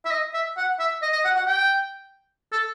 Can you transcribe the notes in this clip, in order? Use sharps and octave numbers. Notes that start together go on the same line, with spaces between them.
E5
D#5
E5
F#5
E5
D#5
D#5
F#5
F#5
G5
A4